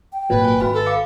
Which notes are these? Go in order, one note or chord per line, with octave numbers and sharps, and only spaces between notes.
G5
G#1 A#2 F#3 B4
G#5
G#1 F#4 B4 B5
A4
F5 D6 C#7